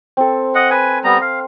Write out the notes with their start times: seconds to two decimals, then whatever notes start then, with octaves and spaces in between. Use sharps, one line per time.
0.17 C4 A4
0.55 D#5 F#5
0.70 B4 G#5
1.04 G3 B3 A#5
1.21 F5